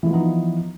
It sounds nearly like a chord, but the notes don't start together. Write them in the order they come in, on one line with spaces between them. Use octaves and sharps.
E3 F3 B3 D#4